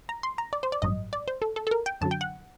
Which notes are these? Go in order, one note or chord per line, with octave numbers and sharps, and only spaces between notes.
A#5
C6
A#5
D5
C5
D5
A1 G2 F#3 D#5
D5
C5
A4
A4
A4
A#4
G5
F#2 D3 F#3 A5
G5
F#5